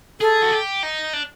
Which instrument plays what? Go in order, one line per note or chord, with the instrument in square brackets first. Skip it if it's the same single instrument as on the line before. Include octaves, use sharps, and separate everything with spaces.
[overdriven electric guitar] G#4 [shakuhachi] A4
[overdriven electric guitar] F#4
G4
D#4
D4